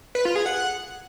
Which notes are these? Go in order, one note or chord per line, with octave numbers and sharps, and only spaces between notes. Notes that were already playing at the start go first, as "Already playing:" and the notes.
B4
F4
G#4
F#5